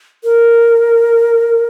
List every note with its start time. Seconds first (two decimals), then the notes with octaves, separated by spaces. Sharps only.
0.24 A#4